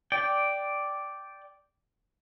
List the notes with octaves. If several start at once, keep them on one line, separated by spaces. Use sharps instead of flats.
D5 G5